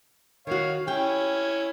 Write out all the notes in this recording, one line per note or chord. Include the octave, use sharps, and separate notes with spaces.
D#3 F#4 C#5 F5
C#4 E4 G4 G5